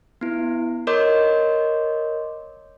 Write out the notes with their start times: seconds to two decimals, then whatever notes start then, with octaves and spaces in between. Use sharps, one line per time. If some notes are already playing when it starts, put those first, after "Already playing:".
0.21 B3 E4
0.87 A#4 C#5 D#5 C6 D6 G6